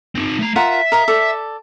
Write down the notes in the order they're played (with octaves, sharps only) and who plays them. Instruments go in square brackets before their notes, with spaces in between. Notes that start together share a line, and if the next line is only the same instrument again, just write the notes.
[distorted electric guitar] C4 D#4
A3 A#5
[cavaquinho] F4 A#4 F#5 [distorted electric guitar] E5
[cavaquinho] A#4 D#5 F5
A4 D5